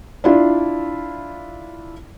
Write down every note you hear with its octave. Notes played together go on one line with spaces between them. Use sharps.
D4 E4 F4